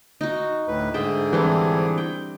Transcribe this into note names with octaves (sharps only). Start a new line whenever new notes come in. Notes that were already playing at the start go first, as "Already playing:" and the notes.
D#4 F#4
D2 A2 B4
G#2 D3 G#4 E5 G5 A5
E3 G3 C4 D4
G5